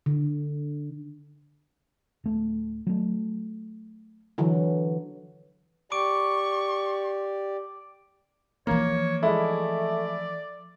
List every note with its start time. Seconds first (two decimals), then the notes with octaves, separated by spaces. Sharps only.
0.06 D3
2.24 D1 A3
2.87 F#3 A3
4.38 D3 E3 F#3
5.92 G4 D5 C#6 D6 D7
8.67 E3 F3 A#3 C#5
9.23 G#3 A3 E4 D5